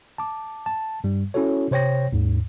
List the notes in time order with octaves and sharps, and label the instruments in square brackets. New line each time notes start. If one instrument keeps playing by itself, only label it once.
[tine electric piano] A5 D6
A5
G2 G3
C#4 E4 F#4 A4 C#5
C3 C5 C#5 G5 A#6
D#2 G#2